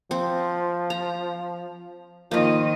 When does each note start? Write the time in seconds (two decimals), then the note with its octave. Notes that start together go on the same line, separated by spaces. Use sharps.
0.11 F3 C4
0.90 A#5
2.31 D#3 F3 A#3 F4 D#5